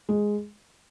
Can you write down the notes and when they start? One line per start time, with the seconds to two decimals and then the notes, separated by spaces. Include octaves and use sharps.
0.09 G#3